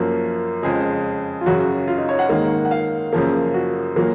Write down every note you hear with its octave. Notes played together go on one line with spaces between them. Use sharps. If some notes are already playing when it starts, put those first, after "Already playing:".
Already playing: F#2 F3 A#3 F#4
F2 C#3 G#3 G#4
F4
F#2 C#3 F#3 F#4
F4
D#4
C#5
F#5
G#2 D#3 A#3
F#5
F5
F#2 C#3 F3 A#3
F#4
A#2 F#3 A#3